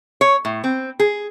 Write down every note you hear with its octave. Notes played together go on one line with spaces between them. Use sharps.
C#5
A2
C4
G#4